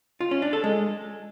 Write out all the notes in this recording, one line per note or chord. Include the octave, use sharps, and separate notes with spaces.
F4
C#4
D4
A4
G#3